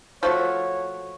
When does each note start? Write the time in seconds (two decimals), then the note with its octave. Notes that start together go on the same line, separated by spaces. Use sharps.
0.23 F3 A3 F#4 C#5